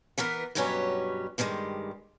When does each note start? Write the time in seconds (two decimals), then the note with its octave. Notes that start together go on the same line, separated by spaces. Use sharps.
0.18 E3 B3 A#4 B4
0.55 G2 B2 F#3 G3 C#4 B4
1.38 G2 D#3 E3 G3 G#3